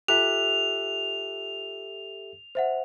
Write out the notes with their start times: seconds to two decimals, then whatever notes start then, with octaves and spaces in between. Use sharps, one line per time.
0.08 F4 G4 A4 E5 F#6 F7
2.55 C5 E5 F#5